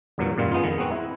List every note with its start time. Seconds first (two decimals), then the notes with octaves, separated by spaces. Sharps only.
0.18 E2 G2 A#2 F#3
0.38 F#2 A#2 D#3 G3 F4
0.52 G#3 B3 D#4 F4
0.64 F2 D#3
0.78 G#3 B3 C4 F#4
0.92 E4